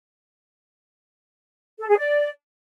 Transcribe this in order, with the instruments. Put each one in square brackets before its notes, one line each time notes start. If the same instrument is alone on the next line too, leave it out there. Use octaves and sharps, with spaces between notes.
[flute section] A4
G#4
D5